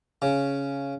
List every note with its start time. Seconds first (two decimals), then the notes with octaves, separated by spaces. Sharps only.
0.22 C#3